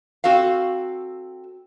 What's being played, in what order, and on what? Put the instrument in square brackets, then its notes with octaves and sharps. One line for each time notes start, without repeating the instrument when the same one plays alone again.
[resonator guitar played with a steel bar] C4 F#4 A4 F5